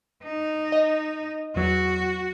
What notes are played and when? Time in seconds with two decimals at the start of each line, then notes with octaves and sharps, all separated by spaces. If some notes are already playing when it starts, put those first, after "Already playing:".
0.23 D#4
0.72 D#5
1.56 E2 F#3 F#4